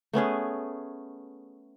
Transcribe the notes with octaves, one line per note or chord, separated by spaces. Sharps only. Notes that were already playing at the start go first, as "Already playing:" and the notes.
A3 B3 C#4 G#4